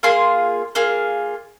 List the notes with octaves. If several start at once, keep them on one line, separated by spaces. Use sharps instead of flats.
A#3 F4 G#4 C6
A#3 F4 G#4